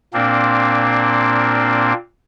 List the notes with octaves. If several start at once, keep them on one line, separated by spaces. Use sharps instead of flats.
A#2 A#3 C4 D4